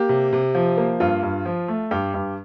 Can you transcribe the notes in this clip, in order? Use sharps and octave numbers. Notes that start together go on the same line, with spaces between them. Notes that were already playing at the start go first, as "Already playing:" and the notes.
Already playing: A#3 G4
C3
C3
F3
A#3
G2 F4
G2
F3
A3
G2 G4
G2